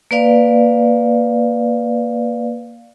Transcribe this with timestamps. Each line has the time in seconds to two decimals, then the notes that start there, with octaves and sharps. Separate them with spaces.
0.11 A#3 B4 D5 F5